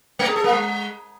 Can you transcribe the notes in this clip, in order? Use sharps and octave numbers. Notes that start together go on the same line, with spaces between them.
A3
G#4
A4
A#3
G#3